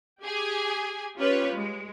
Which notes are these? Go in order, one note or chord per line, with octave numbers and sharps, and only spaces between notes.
G4 G#4 G#5
C#4 F4 G4 B4 C#5
G#3